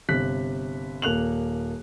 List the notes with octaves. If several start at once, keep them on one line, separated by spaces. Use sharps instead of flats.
G1 C3 F#6 B6
D#1 A#3 F#6 F7 F#7